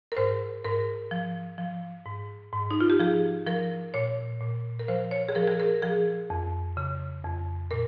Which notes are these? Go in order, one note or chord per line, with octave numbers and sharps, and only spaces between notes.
A#4
G#2 C5
G#2 A#4
F3
F3
G#2
G#2
D#4
F4
G4
F3 G#4
F3 A#4
A#2 C#5
A#2
A#4
F3 C5
C#5
G#4
F3 A#4
G#4
A#4
F3 G#4
F2
C#3
F2
A#2 A#4